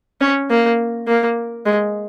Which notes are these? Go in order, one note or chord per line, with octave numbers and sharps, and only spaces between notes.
C#4
A#3
A#3
G#3